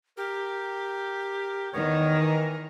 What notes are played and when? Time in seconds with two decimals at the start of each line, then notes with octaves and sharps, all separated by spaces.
0.17 G4 A#4
1.73 E2 D#3 B3 A#4 C#5
2.19 E3